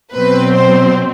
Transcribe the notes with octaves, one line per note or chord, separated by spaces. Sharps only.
B2 F#3 C4 B4
C5